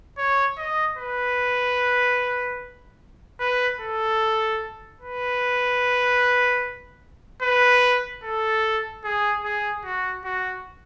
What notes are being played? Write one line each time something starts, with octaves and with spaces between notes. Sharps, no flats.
C#5
D#5
B4
B4
A4
B4
B4
A4
G#4
G#4
F#4
F#4